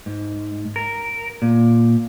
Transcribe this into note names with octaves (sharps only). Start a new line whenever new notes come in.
G#2
A#4
A#2